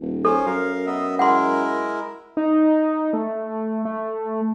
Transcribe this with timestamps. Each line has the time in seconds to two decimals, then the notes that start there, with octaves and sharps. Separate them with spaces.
0.01 D#1
0.25 C#4 A4 C5 C#5
0.46 F#2 A#4 F5
0.86 B3 D#5 E5
1.19 G#3 E4 A#4 F#5 C6
2.37 D#4
3.13 A3
3.85 A3